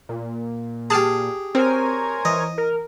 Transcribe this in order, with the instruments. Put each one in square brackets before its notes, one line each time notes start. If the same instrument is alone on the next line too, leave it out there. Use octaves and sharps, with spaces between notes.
[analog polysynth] A#2
[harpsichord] G4 G#4 [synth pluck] A5 F6 C7
[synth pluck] C4 [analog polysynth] A#4 C#5 G#5 [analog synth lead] C5
[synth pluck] E3 [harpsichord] D#5
[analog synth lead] A#4